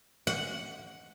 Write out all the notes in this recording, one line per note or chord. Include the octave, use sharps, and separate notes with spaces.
F#5